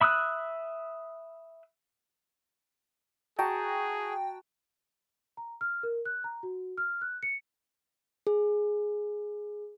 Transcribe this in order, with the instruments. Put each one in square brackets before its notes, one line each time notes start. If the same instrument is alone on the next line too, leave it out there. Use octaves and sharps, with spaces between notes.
[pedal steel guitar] E5 B5 D#6 E6 F#6
[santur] F#4 A5 A#5 [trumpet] G#4 [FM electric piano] G5
[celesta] A#5
F6
A#4
F#6
A#5
F#4
F6
F#6
C#7
[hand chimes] G#4